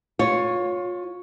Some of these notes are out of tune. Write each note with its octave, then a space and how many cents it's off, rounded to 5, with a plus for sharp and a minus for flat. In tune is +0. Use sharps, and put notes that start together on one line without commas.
F4 +30 C#5 +0